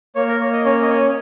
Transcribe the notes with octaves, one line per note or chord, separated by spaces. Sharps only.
A#3 C#5
A#4
A#3 C#5
D#5
C#4 C#5
D#5
C#4 C#5